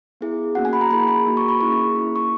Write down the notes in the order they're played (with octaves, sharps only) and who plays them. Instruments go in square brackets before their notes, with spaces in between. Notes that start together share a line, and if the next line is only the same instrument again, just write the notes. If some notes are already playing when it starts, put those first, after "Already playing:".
[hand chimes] B3 E4 G#4
A#3 C#4 F#4 F#5
G#5
B5
A#5
A#3 E4 G#4 B5
B5
A#3 D#4 F#4
C#6
B5
A#3 C#4 E4 G#4 C#6
A#3 C#4 E4
C#6